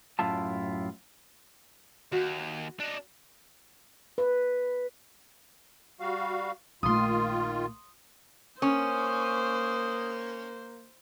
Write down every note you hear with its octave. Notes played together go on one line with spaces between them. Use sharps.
F#2 A2 E4 F4 A5
D#2 F#4
D4 D#4
B4
G3 F#4 F5
A#1 D#3 A3 F4 C6 D#6
A#3 C#4 C5 D#6